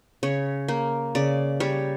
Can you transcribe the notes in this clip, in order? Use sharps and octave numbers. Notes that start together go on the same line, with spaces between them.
C#3 C#5
A#3
C#3 D5
G3 C#5